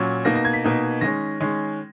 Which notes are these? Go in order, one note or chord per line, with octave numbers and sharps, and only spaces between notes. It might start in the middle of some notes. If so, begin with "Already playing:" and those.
Already playing: A#2 F#3 C#4
B2 A#3 D#4 A#6
A#6
G#6
B6
B2 A#3 D#4
D#3 G#3 C#4 A#6
D#3 G#3 C#4